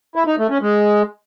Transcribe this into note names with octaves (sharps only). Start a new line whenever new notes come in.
E4
D#4
A3
C#4
G#3